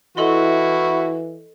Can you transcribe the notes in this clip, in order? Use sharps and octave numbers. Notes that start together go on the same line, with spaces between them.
E3 E4 F#4 A4 D#5 C6